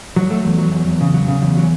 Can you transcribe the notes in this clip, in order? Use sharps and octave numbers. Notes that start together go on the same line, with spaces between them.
F#3
A3
E2
F#3
E2
E2
C#3
F#3
C#3
E2
F#3